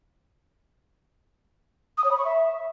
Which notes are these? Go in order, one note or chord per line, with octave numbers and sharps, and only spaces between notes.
D#6
C#5
B5
C#6
E5